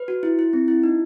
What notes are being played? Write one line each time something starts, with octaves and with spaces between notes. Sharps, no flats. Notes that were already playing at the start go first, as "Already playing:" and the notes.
Already playing: B4
F#4
E4
E4
C4
E4
D#4